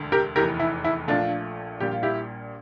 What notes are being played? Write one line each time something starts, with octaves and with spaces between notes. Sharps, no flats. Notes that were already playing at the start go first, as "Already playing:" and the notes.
Already playing: E1 D2 D3
G4 A#4
F1 E2 E3 G4 A#4
E4
E4
A#1 A#2 F3 A3 D4 F4
A#1 A#2 G3 A#3 G4
F4
E4 G4